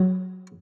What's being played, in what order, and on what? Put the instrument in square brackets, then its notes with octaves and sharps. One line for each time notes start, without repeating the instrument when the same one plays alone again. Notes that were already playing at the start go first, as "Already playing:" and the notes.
Already playing: [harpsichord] F#3